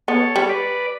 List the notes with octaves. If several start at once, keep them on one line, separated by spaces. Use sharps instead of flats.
B3 A4 C#5
G3
B4 D5